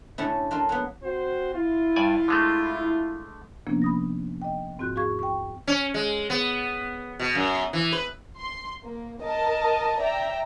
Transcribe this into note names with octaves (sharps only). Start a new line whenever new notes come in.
A2 D3 A3 C#4 E4
D4 F4 A4 A#4
F#3 A#3 B3
C4 F#4 C5
E4 F4
G2 D5 G#5
D3 G#3 A3
C3 F3 A#3 B3 C#4 D4
B5 D#6 A#6
D#5 G5
G#2 C4 F4 F#4 F#6 G6
E2 F#4 G#4 F5 C#6 G#6
G5 C#6
C#4
G#3
B3
B2
F#2
E3
B4
C6
A#3
A#4 D#5 A5
D5 E5 G5 A#5